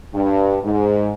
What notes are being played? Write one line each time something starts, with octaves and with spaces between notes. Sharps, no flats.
G2
G#2